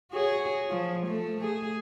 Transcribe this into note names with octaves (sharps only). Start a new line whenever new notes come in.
F#4 G#4 C#5
F3
A3
G#4